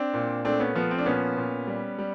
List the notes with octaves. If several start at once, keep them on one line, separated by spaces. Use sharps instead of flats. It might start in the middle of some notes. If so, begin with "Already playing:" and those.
Already playing: C4 D4
A#2
A3 C4 D4
B3 C#4
F3 B3
C4
D4
A#2 B3 C#4
A#2
G3
G3